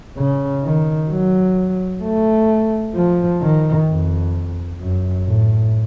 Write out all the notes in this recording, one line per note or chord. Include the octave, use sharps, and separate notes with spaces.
C#3
D#3
F#3
A3
F3
D#3
F2
F#2
A2